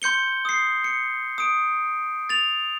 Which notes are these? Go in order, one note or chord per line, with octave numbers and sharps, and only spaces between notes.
C6 G6 C#7 G7
D#6 C7
C#7
D#6 D7
A6 F7